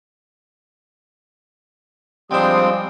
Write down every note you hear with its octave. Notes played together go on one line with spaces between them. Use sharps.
F3 G3 G#3 C4 D4 F5 G5 D#6